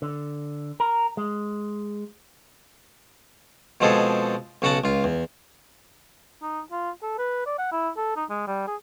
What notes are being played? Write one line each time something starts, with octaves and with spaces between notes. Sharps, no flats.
D3
A#4
G#3
B2 F3 G#3 C4 G#4 A4
B1 C#3 F#4 F#5 A5
C#2 F4
E2
D#4
F4
A4
B4
D5
F#5
E4
A4
D#4
G#3
G3
G#4